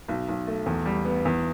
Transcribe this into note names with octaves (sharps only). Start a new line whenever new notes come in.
B1
B1
A3
E2
G3
B3
E2